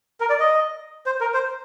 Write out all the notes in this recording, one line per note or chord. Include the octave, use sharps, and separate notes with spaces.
A#4
D5
D#5
C5
A#4
C5